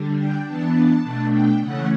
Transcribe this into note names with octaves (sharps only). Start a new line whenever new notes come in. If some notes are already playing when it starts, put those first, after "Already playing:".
Already playing: D3 G3 D4
G5
E3 B3 D4 A5
B2 A3 D4
G5
C#3 E3 A3 C#4 F#5